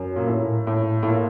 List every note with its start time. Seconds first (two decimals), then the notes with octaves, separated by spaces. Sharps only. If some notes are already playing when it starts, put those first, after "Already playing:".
Already playing: F#2
0.16 A#2
0.27 A2
0.67 A2
1.03 A2
1.08 A#2